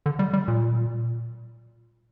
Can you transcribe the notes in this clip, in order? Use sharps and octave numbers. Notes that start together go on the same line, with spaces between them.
D3
G3
G3
A#2